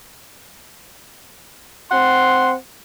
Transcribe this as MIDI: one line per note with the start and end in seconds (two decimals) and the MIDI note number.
1.92 2.54 60
1.92 2.54 78
1.92 2.54 84